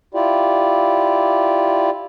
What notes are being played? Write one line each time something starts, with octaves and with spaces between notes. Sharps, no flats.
E4 F4 G4 D5